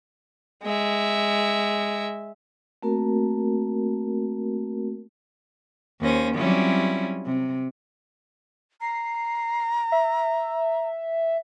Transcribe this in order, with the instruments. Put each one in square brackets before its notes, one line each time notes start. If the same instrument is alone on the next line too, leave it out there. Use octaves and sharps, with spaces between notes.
[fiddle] G#3 E5
[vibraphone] A3 A#3 C4 F#4 A#4
[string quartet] D#2 C#4 C5 A#6
F#3 G3 C4 C#4 E4 F4
C3
[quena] A#5 [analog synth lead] C7
[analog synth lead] E5